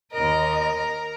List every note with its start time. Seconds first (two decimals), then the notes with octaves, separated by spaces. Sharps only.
0.13 D#2 A#4 D#5